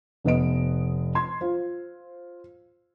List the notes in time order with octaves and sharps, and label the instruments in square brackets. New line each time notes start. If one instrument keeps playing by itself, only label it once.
[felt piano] F1 B3 D#5 D7
C6 G#6
F4 C5